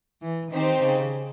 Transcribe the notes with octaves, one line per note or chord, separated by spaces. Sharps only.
E3
D#3 C4 D#4 G4 C5
C#3